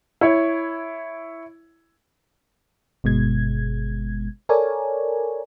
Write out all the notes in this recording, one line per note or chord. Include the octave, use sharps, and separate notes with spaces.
E4 C#5
G1 B2 G#3 G#6
A4 A#4 C#5 D5 G#5